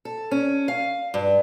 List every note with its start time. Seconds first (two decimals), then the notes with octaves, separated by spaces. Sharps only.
0.05 A4
0.31 C#4
0.68 F5
1.14 G2